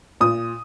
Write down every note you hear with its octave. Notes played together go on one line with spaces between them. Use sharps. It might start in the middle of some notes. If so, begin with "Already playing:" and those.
A#2 D#6